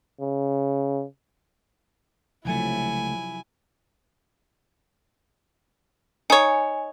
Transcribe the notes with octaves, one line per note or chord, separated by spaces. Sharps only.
C#3
C#2 C3 F3 F#3 A3 E4 G#5
D#4 C#5 G#5